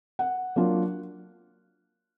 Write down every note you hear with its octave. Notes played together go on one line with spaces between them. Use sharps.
F#5
F#3 A#3 D4 F4